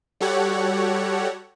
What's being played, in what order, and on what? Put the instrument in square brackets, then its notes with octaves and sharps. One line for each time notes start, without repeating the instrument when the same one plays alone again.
[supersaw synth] G3 F#4 G4 A4 C#5 F#5